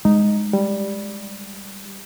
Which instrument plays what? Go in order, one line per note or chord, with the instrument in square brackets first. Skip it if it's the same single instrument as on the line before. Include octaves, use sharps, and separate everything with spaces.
[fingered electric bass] G#3 [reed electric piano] D#4
[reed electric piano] G3